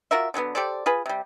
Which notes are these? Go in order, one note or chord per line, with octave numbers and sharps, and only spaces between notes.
F4 F#4 A#4 E5
D3 F#3 G#3 B3
G4 A4 C5 D5
F4 G#4 B4
C3 G3